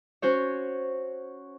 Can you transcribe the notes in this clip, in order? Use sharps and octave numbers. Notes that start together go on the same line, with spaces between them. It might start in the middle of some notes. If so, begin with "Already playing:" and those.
C#4 F#4 C5 C#5